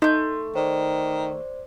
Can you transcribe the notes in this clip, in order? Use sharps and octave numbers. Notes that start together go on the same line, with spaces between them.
A3 D#4 C6 G6
D#3 C5 D5